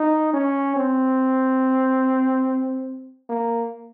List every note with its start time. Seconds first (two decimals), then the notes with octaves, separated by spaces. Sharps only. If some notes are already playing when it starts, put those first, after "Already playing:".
Already playing: D#4
0.33 C#4
0.76 C4
3.29 A#3